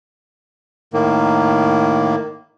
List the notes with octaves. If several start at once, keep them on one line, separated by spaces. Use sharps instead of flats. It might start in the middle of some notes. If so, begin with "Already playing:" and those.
A2 D#3 A#3